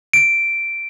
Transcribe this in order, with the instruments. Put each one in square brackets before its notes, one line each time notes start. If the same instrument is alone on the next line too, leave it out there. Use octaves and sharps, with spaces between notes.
[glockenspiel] D7